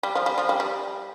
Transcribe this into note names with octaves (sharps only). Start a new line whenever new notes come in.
G3
F3
G3
F3
G3
G3